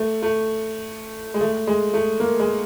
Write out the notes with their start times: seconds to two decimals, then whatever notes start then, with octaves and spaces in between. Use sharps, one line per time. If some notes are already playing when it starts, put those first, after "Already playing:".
Already playing: A3
0.23 A3
1.34 G#3
1.41 A3
1.67 G#3
1.94 A3
2.20 A#3
2.39 G#3